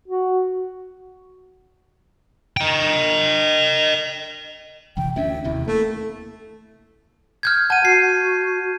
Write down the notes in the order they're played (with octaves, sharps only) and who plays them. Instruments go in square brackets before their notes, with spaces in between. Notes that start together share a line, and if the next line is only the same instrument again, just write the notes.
[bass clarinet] F#4
[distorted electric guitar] D#5 G5
[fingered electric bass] F#1 C3 E3 [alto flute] G5
[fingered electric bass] D2 C#4 D4 [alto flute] E5
[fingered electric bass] E1 D#2 C3 [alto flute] E4
[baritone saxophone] A3 [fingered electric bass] A#3
[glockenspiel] F6 G6 G#6
[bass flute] F#5 [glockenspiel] A5 D#7
[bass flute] F#4 [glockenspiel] C7